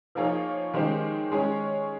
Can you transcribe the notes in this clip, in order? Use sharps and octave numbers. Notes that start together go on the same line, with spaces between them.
F3 A#3 D#4 G#4 C#5
D#3 G#3 C#4 G4 C5
G#3 C#4 G#4 C#5